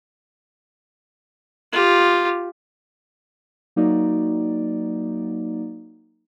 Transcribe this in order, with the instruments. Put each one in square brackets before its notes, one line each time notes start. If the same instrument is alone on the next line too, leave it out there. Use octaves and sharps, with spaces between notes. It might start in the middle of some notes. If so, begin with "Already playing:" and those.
[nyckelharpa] F4 G4
[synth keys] F#3 A#3 D#4 F#4 D5